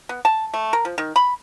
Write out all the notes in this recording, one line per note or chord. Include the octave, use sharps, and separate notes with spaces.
B3
A5
A3
A#4
F3
D#3
B5